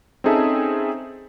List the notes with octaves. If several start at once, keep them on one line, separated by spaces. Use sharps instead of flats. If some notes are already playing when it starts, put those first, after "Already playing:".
C4 C#4 D#4 G#4 A4 E5